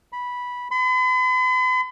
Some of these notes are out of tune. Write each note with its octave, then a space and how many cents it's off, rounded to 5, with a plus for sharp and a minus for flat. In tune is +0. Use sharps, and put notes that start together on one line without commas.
B5 -10
B5 +45